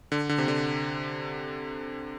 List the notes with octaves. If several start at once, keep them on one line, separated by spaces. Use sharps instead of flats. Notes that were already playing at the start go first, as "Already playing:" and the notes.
D3
D3
C3
D3